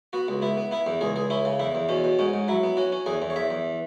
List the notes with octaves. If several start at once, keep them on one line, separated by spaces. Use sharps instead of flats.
B3 F#4
C#2
B3 E4
B3
B3 E4
E2
C#2 G#4
C#2 G#4
C#4 E4
C#3
E2 E4
E2
B2 C#4
B2
G#2 C#4
G#2
F#3 E4
B3
C#4 F#4
C#4
E2 G#4
E2
C#5
E2 E5
E2